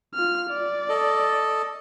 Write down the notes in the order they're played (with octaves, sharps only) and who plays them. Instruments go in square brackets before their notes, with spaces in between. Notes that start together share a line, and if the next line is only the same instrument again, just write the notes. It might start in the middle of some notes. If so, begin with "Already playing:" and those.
[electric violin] F4 F6
D5
[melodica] A4 D#5